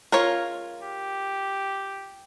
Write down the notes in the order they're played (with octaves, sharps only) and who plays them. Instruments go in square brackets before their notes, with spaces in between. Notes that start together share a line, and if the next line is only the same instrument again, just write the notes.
[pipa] G#3 C#4 F4 [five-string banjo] A#4 C#5
[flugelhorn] G4